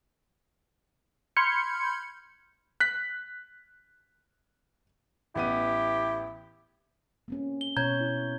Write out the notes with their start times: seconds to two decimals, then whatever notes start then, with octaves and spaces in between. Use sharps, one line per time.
1.36 B5 C6 F6 G6 G#6 C#7
2.80 F#6 B6
5.35 A1 B3 E4 G4 D#7
7.28 A#3 C4 C#4
7.61 G7
7.77 B2 C#4 C#5 A#5 G6 G#6
8.00 E4